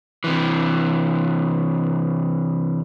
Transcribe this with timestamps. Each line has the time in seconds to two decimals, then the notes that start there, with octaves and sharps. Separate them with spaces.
0.24 C3 E3